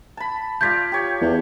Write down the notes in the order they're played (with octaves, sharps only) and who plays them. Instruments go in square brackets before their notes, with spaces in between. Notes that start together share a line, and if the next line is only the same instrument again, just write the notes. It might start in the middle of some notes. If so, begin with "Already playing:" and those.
[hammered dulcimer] A5 B5
[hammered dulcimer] F4 D5 F5 [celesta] G6 G#6 B6
[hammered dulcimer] G4 C#5
[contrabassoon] E2